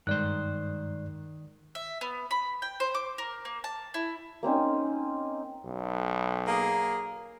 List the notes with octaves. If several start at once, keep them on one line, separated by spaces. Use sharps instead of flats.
G2 D#3 G#3 C5 D5 F#6
E5
B3
B5
G5
C5
D6
A#4
A#3
A5
E4
A#3 C4 C#4 D#4
B1
A#3 G#4